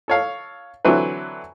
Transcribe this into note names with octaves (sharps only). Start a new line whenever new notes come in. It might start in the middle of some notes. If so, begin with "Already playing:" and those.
A4 C#5 F5
D3 E3 F#3 C4 E4 B4